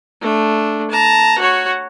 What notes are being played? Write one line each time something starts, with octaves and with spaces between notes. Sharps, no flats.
A3 D4
A5 A#5
F#4 C#5